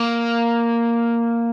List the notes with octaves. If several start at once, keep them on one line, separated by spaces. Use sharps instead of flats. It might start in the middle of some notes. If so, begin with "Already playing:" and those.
Already playing: A#3